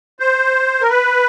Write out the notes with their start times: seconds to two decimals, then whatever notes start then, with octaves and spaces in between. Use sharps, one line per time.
0.20 C5
0.81 A#4
0.90 B4